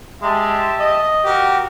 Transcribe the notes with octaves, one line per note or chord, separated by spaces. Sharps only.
G#3 G4 E5 A5
D#5
F#4 G4 A#4